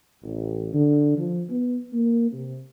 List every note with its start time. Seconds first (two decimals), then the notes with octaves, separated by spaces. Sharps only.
0.22 A1
0.73 D3
1.17 F3
1.48 B3
1.93 A#3
2.31 C3